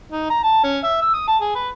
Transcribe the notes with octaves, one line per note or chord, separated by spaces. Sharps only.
D#4
A#5
A5
C#4
E5
E6
D#6
A5
G#4
B4